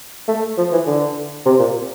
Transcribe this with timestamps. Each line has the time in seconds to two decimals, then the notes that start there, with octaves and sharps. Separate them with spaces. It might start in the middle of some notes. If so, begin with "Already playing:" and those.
0.28 A3
0.58 F3
0.73 E3
0.87 D3
1.46 C3
1.59 A#2